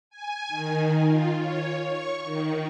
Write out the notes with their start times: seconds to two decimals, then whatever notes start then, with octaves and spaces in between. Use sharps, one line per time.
0.10 G#5
0.48 D#3
1.07 F4
1.38 C#5
1.84 C#6
2.23 D#3